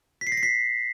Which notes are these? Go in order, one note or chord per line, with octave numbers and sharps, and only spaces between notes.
B6
C7
A#6
C7
B6